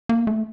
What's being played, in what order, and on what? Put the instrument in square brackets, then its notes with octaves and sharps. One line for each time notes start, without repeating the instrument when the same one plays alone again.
[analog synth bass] A#3
A3